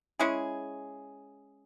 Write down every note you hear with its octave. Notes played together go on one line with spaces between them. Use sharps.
G#3 C#4 E4 G#4